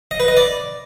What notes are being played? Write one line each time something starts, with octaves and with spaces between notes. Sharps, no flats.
D#5
B4
D#5
D5